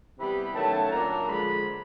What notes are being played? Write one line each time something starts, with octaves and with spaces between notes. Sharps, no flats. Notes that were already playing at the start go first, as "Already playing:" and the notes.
C3 E3 G3 B3 B5
D#3 F#3 A3 C#4 A5
A#2 F#3 A#3 D4 A#5
D3 F3 G#3 B5